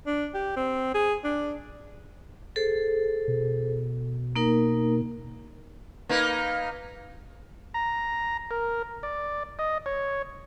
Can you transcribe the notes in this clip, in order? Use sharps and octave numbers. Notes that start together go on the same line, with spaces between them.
D4
G4
C4
G#4
D4
G#4 A4 C5
B2
A#3 D#4 A#4
A#3 D#4 B4
A#5
A#4
D5
D#5
C#5